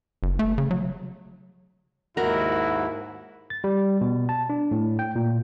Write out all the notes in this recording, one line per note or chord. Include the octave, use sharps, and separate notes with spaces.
F#1
A3
C#3
F#3
D#2 G#2 E4 F#4 A#4
A6
G3
B2
A5
D4
A2
G5
A#2